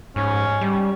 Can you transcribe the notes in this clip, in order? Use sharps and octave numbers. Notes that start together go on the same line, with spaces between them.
G#2 C#4
G3